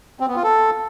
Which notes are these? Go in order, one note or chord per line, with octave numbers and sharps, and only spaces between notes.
C4
B3
F4
A4